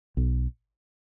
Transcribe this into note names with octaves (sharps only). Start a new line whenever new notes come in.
B1